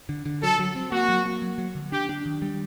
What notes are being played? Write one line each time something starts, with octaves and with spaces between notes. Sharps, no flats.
D3
D3
F#3 A4
F#3
C4
A#3 F#4
F#3
A#3
F#3
F#3
D3
D4 G4
D4
D#3
G3